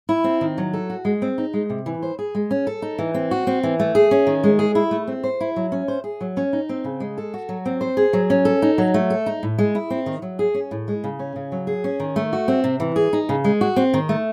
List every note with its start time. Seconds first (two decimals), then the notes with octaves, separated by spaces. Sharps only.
0.09 E4
0.24 C4
0.41 D#3
0.58 F#3
0.73 A4
0.90 F#4
1.05 G#3
1.22 C4
1.38 D#4
1.54 G#3
1.70 C3
1.86 E3
2.03 C5
2.19 G#4
2.35 G#3
2.51 C#4
2.67 A4
2.82 D#4
2.99 E3
3.14 C4
3.31 F#4
3.47 C4
3.63 E3
3.80 A3
3.95 G#4
4.11 C#4
4.27 D#3
4.44 G#3
4.59 G#4
4.75 E4
4.91 A3
5.08 C4
5.24 C5
5.41 E4
5.56 F#3
5.72 C#4
5.88 C5
6.04 G#4
6.21 F#3
6.37 C#4
6.53 D#4
6.69 C4
6.84 C#3
7.00 G#3
7.18 A4
7.34 F#4
7.49 F#3
7.66 C4
7.81 C5
7.97 G#4
8.13 F#3
8.30 C#4
8.45 A4
8.62 D#4
8.78 F#3
8.94 A3
9.10 A4
9.26 D#4
9.43 A2
9.58 G#3
9.75 E4
9.90 C4
10.06 D#3
10.22 F#3
10.39 G#4
10.54 C#4
10.71 A2
10.88 G#3
11.04 C#3
11.19 C#4
11.36 C#3
11.52 F#3
11.67 G#4
11.84 C#4
12.00 D#3
12.16 A3
12.33 F#4
12.48 C4
12.64 C3
12.80 E3
12.96 G#4
13.13 D#4
13.29 C#3
13.44 G#3
13.61 F#4
13.76 C4
13.94 D#3
14.09 A3